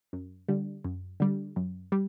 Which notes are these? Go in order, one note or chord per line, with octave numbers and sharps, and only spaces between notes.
F#2
D3 G3
F#2
D3 G3
F#2
G3